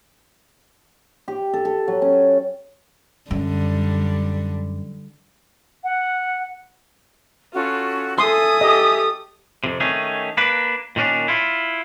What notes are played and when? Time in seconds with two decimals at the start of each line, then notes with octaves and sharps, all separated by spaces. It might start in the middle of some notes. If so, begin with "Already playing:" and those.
1.28 G4
1.53 A4
1.65 A4
1.88 F#3
2.02 C#4
3.31 F#2 D3 G3
5.83 F#5
7.53 C#4 F4 F#4 A4
8.18 A4 E5 G#5 C6 D#6
8.61 G4 A4 D#5
9.64 F2 C3
9.80 D#3 A3 C#4 G#4
10.37 A#3 D4 B4
10.96 A#2 D#3 C#4 D4
11.28 E4 F4